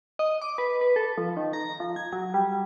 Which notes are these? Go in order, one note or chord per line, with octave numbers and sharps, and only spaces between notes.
D#5
D6
B4
B4
A4
F3
D#3
A#5
F3
G#6
F#3
G3